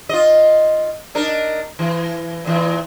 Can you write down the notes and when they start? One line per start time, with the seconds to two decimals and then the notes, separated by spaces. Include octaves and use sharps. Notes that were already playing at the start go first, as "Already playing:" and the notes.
0.09 F4 D#5
1.15 D4 D#4 A#4
1.79 E3
2.45 A#2 E3